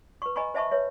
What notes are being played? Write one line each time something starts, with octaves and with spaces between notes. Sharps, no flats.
B4 C#6
D#5 G#5 A#5 B5 C#6
C5 D#5 E5 A5 B5 C#6
B4 C#5 E5